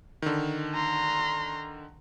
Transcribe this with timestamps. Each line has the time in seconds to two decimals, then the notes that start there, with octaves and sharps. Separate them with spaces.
0.22 D3 D#3
0.75 A#5 C6